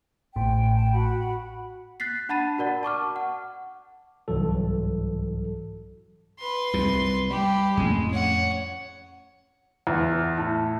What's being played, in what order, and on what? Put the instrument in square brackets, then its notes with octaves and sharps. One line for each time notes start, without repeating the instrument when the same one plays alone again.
[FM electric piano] A1 A2 [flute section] G5
[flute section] G5 A5
F#4 F#5 B5
[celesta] F#6 A6 B6 C7
D4 F#5 A5 B5 A6 D#7
F#4 A#4 D5 F#5
A5 C#6 D6 F6
F#5
[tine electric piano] C2 G#2 E3 F#3 A4
[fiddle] B4 C6
[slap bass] C2 F#2 C3
[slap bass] G3 [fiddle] G4 B5
[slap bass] F2 A2 C#4 [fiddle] G#3
[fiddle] C#5 F#5
[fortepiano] E2
A2